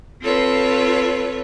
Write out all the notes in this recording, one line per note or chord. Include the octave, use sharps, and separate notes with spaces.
C4 F4 A4 B4 C#5